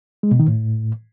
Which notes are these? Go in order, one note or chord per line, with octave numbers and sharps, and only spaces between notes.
G#3
B2
D#3
A2